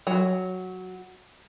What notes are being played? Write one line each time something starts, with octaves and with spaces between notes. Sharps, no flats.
F#3